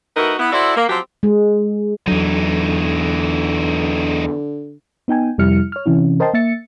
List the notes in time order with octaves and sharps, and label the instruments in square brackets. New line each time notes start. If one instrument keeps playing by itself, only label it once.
[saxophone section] A3 D#4 E4 F#4 A#4 B4
B3 E4
E4 F#4 A4 C5 D5 E5
A#3
F3 F#3 C4 G4
[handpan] G#3
[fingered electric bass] E2 F#3 [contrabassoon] D3 [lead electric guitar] E3 D#4
[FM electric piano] B3 D#4 G5 G#5
F2 C3 G3 E4 F6 C#7
C#5 F6
C3 E3 C#4 E4
A#4 C5 D#5 G5 A5 C6
A#3 E5 A6 C#7